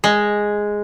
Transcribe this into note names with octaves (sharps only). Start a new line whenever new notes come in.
G#3